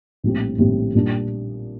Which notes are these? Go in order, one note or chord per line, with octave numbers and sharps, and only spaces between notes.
A#1 A2 G3 C4 G4
A#1 A2 G3 C4 G4
A#2 G3 D4